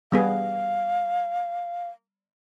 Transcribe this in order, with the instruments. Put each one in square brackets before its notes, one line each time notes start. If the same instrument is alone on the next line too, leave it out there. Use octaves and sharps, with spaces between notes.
[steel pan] G3 B3 G#4 [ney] F5